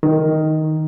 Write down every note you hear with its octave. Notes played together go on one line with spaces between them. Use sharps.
D#3